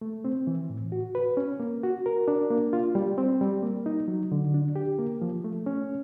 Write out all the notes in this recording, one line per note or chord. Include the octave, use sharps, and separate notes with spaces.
A3
C4
E3
A2
F#4
B4
C#4
A#3
F#4
A#4
D4
A#3
F4
G3
C4
G3
A#3
D#4
F#3
D3
D4
G4
A#3
F3
A3
C#4